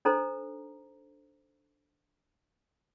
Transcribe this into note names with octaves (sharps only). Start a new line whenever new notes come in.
D4 D#4 A4 C5 A#5